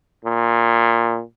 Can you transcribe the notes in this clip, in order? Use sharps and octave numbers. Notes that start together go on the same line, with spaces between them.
A#2